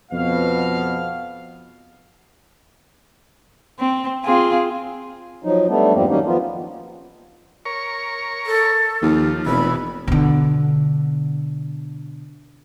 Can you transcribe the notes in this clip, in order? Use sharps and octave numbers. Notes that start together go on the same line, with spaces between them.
F2 B2 B3 F5
C4
C4 F4 G#4
F3 F#3 D#4
G3 A3 B3 D4
E2 G2 F3 G3 A#3 C4
D#3 F#3 G3 A#3 C#4 D#4
F3 B3 F4
A#4 C#5 C#6
A4
D#2 F3
F1 B2 E3 B5
B2 D3